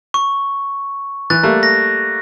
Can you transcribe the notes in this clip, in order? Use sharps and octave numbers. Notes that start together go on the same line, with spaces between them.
C#6
E3 F#6 A6
G3 A3 A#3
A#6